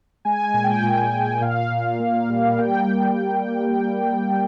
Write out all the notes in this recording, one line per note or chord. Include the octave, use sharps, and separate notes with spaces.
G#3 G#5
G#5
A#2
G5
A#2
A#2
A#2 F5
A#2
A#3
G3
A#3 G5